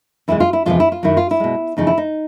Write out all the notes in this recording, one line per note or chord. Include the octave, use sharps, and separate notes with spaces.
E2 C3 E3 G#3 E4
F4
E4
E2 C3 F3 G#3 F4
E4
F4
F#2 D#3 F#3 E4
F4
E4
B2 G#3
E2 C#3 F3 D#4
E4
D#4